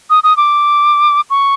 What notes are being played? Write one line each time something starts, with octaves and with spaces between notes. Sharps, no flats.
D#6
D#6
D6
C#6